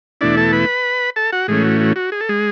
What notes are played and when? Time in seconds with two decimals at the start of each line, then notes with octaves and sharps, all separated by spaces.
0.21 E2 B2 A3 D4 E4 D5
0.37 A4 A5
0.53 B4 B5
1.16 A4 A5
1.32 F#4 F#5
1.48 A2 E3 G#3 A3 C#4 G#4
1.64 F#4
1.80 F#4
1.96 F#4
2.12 G#4
2.21 A4
2.29 G#3 G#4